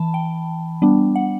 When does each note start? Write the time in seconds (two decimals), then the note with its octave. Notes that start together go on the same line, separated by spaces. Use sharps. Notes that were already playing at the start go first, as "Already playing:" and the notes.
Already playing: E3 A5 B5
0.14 G5
0.82 G3 B3 D4
1.15 F#5